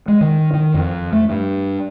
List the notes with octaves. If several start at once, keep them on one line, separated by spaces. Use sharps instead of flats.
G#3
D#3
D#3
F2
A3
G2